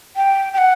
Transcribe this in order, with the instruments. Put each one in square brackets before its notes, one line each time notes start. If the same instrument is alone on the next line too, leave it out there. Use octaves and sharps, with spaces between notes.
[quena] G5
G5
F#5